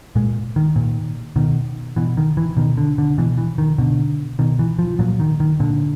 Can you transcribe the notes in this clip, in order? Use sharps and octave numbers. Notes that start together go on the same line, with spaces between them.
A#2 G#3
D#3
A#2
B2 D#3
B2 E3
D#3
E3
B2 D#3
D3
D3
B2 E3
E3
D#3
B2 D3
B2 D#3
E3
F3
A#2 F#3
D#3
D#3
A#2 D3